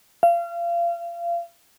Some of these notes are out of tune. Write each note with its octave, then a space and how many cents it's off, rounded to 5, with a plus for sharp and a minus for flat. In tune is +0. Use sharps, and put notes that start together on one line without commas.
F5 -30